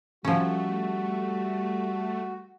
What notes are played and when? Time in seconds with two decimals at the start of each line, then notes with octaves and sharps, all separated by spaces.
0.25 F3 G3 A3 C#4 F#4